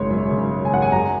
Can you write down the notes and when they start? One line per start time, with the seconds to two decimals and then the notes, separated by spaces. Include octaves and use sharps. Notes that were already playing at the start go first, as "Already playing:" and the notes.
Already playing: G#1 F#2 C#3 G#3 C#5 C6
0.10 F#2
0.31 C#3
0.52 G#3
0.65 G#5
0.71 G#1 F#5
0.82 G#5
0.92 F#2 A#5